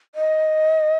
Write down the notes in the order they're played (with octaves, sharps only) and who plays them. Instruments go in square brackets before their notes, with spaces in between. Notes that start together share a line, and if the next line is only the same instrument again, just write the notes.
[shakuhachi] D#5